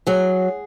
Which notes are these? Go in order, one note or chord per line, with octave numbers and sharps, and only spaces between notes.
F#3 G#4